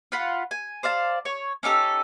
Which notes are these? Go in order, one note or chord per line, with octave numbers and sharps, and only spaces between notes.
F4 F5 F#5 B5
G#5
C5 D5 F5 A5
C#5 C#6
C#4 D#4 G4 A4